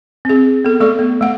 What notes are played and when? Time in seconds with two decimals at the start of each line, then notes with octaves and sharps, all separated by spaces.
0.25 C4 G#4
0.64 B3 A4
0.80 A3 A4 D5 C#6
0.99 B3
1.21 A3 F#5